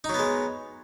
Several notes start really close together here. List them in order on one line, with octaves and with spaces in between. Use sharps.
D#4 F#3 B3 G#3